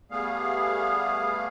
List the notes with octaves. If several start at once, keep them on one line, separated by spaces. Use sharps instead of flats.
G3 A3 B3 G#4 F5